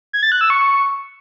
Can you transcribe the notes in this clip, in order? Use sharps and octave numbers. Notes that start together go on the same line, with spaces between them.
G#6
A6
F#6
E6
C#6